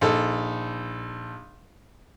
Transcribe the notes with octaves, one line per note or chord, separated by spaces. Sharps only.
A#1 D#4 A4